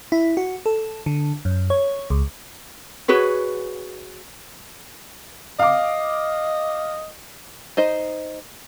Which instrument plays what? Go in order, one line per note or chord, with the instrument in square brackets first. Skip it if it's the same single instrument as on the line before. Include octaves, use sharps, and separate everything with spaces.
[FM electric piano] E4
F#4
A4
D3
F#2
C#5
C#2
[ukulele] F#4 G#4 B4 C#5
[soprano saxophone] D#5 [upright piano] F5 D6
[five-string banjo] D#4 C5 D#5